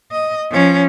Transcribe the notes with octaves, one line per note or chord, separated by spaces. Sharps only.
D#5
F3 C#4